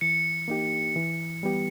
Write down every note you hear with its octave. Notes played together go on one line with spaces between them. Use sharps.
E3 C#7
A#3 D#4 G4
E3
G3 B3 G4